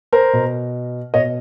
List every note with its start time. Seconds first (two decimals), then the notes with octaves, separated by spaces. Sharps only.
0.13 A#4 C5
0.33 B2
1.14 B2 C#5 D#5